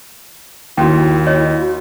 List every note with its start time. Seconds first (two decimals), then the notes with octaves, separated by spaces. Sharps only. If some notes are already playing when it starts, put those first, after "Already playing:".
0.78 D#2 E4 F#4 G5
1.26 C#5 D#5
1.61 F#4